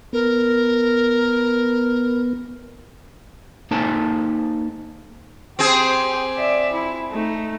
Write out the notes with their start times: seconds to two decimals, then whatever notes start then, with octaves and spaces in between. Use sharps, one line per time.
0.13 B3 A#4
3.71 A#3 D#4 A4 C5 G#5 A5
5.59 C4 G4 G#4 C5
6.36 D5 E5
6.73 E4
7.12 A3 D#4